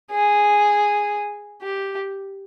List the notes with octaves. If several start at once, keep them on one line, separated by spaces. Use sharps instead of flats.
G#4
G4